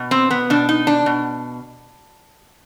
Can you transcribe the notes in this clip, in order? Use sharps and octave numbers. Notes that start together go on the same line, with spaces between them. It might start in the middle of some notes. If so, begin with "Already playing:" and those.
Already playing: B2
C4
B3
B2 D4
D#4
D4
B2